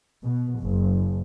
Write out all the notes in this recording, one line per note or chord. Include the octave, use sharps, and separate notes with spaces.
B2
F#1